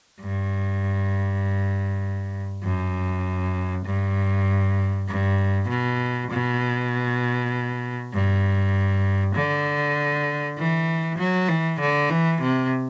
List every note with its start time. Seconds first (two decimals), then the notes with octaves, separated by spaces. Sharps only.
0.21 G2
2.64 F#2
3.86 G2
5.08 G2
5.69 B2
6.31 B2
8.14 G2
9.35 D3
10.57 E3
11.18 F#3
11.49 E3
11.80 D3
12.10 E3
12.41 C3